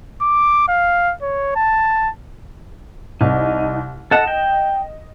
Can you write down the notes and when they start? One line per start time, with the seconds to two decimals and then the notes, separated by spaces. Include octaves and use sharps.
0.22 D6
0.68 F5
1.22 C#5
1.56 A5
3.21 C2 D#4
4.11 A4 D#5 F#5 E7
4.28 G5